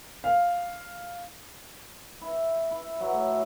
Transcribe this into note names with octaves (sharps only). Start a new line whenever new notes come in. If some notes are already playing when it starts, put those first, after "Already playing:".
F5
E4
E4
F#3
A2